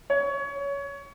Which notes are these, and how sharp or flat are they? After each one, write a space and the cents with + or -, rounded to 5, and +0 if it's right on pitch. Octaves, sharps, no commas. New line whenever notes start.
C#5 +20